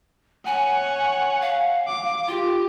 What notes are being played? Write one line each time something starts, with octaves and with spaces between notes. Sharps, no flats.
C#5 F#5 G#5
F5
D6
F4 G4